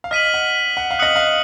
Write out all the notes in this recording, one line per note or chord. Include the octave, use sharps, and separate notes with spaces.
F5
D#5 F6 B6 D#7 F#7
F#5
F#5
F5
D#5 D#6 F#6 C#7 F#7
F5